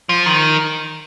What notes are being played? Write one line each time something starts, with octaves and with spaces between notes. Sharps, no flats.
F3
D#3